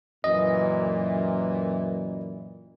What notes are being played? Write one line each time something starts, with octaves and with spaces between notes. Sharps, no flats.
F#2 A#2 E3 D#5